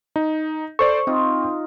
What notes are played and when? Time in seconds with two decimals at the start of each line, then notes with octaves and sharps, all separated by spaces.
0.16 D#4
0.79 A4 C5 D5 C#6
1.07 C4 D#4 F4